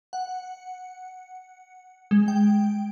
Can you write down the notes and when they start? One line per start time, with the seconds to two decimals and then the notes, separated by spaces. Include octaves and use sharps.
0.13 F#5
2.11 G#3
2.28 G5